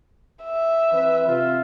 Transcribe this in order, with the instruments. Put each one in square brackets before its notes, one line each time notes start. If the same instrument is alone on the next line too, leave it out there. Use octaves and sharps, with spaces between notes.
[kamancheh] E5
[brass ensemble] E3 C4 B4
C3 F4